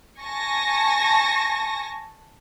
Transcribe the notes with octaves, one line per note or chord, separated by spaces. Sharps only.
G#5 A5 C#6 A#6